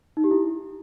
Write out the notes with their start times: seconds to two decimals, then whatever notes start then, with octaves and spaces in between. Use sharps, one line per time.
0.17 D#4
0.24 G4
0.31 E4